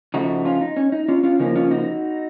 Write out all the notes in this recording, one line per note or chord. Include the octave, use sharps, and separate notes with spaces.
C#3 F3 A3 D#4 F#4
C#4 F4
D#4
C#4
D#4
C#4 F4
C#4 F4
C#3 F3 A#3 C#4 D#4
C#4 F4
D#4 F#4